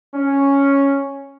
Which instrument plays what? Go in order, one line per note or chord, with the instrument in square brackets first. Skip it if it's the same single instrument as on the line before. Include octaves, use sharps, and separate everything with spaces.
[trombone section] C#4